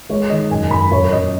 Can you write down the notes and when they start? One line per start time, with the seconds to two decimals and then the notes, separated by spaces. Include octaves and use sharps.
0.09 G#3 C#5
0.30 D#3 D#5
0.51 F#2 G#5
0.71 F#2 B5
0.92 F#2 C#5
1.12 F#2 D#5